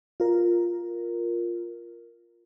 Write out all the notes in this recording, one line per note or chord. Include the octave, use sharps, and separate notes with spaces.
F4 A#4